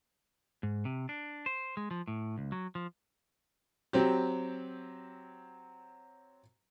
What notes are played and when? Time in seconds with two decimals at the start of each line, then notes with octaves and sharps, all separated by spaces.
0.63 G#2
0.85 C3
1.09 D4
1.46 C5
1.77 G#3
1.91 F3
2.08 A2
2.38 C#2
2.52 F#3
2.75 F3
3.93 F#3 C4 G4